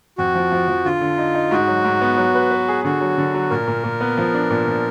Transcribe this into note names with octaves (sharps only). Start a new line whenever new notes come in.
F2 F#4
F3
F3
F3
D3 F4
D3
D#4
D#4
G#2 F#4
F#3
G#2
B3
F#3
B4
B4
G#4
D3 F#4
F#3
D3
F#3
A#2 A#4
A#2
A#2
B3
F3
D4
A#2
F3